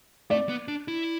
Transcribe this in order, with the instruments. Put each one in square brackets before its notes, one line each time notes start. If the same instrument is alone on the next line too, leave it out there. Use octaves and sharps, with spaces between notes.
[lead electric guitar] A3 [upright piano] D5
[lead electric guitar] B3
D4
E4